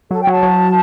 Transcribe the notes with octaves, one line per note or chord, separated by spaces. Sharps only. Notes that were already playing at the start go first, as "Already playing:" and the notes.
F#3 A4
G5
F#3 A5
F#3